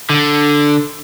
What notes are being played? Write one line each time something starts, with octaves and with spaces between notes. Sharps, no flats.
D3